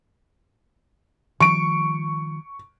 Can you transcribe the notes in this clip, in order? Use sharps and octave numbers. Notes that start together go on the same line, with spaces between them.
D#3 F3 G3 C#6 D7